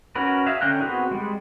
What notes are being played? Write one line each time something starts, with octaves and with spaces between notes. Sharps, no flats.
C#4 F#4 A#4 B4
G#4 E5 F5
D3 C#4 G5 A#5 F#6
B3 C4 F#4 G#4 A#4
G3 G#3